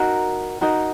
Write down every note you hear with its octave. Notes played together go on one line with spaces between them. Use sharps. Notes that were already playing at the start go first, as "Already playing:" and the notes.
Already playing: D#4 F#4 A#4
D#4 F#4 A#4